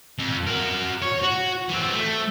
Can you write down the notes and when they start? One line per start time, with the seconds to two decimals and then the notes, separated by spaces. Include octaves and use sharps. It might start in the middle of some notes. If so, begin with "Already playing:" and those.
0.19 F2
0.47 F#4 A#4
1.02 C#5
1.23 F#4
1.69 E3 C4
1.93 A3